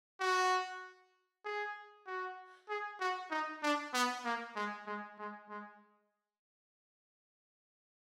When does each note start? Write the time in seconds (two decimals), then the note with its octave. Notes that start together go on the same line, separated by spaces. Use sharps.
0.20 F#4
1.45 G#4
2.07 F#4
2.69 G#4
3.00 F#4
3.31 D#4
3.63 D4
3.94 B3
4.25 A#3
4.56 G#3
4.87 G#3
5.19 G#3
5.49 G#3